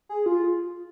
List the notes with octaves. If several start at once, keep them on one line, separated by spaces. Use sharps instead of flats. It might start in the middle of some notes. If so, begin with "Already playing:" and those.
G#4
F4